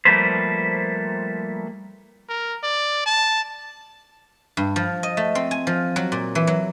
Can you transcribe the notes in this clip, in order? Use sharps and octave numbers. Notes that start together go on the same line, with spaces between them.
F3 G3 A3 A#3 B4 C5
A#4
D5
A5
G2
F3
D#5
A3
C4
G#5
F3
F#3
A#2
E3
F#3